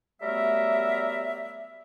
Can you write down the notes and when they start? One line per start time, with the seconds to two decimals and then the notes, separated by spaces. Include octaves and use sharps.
0.22 F#3 G3 A3 B3 A#4 E5